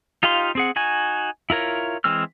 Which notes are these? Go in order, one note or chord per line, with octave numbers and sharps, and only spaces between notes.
D#4 F4 G4 F5 C6
C4 G#4 F#5
D#4 F#4 G#5
E4 F4 A#4 C#5
E3 G#3 C4 E6 F6